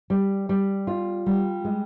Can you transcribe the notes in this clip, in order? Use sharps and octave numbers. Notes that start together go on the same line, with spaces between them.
G3
G3
F4
G3
G#3